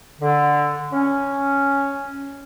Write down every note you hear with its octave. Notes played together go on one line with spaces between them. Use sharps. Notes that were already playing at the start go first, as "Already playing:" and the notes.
D3
C#4